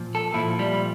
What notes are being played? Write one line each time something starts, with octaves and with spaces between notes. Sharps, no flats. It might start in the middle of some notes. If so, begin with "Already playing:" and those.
Already playing: A#2 F3
A4
A#2 F3 E4
G3